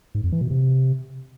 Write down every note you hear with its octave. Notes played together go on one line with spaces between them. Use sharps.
G#2
F2
E3
B2
C3